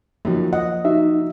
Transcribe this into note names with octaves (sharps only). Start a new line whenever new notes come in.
F#2 D#3 F3 F#3 A#3
D#5 F#5
D#4 F#4 E5